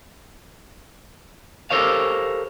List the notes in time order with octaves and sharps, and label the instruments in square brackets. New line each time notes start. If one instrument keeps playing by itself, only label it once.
[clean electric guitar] G4 A4 A#4 C5 C#5 F5